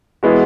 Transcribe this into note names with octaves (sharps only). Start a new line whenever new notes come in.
E3 G#3 B3 F#4